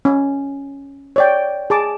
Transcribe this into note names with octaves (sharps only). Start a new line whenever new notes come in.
C#4
C#5 D5 G5
G#4 A5 D6